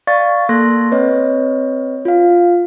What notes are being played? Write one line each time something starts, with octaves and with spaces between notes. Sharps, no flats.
D5 F5 C#6 A6
A#3 A4 C6 F#6 A#6
C4 B4 C#5 D#5
F4 F5